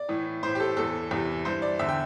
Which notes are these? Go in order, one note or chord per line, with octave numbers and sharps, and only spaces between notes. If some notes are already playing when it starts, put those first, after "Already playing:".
Already playing: D5
A2 E3
A2 E3 C5
G4
A4
E2 E3 A4
E2 C3 E3
G2 E3 C5
D5
E2 D3 E5
G5